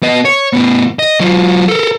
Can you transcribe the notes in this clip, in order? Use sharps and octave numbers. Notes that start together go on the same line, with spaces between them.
B3 D#5
C#5
A2 B3
D#5
F#3 F4
A4 A#4